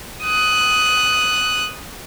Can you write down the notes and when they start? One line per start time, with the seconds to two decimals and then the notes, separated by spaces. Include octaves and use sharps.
0.24 D#6 F#6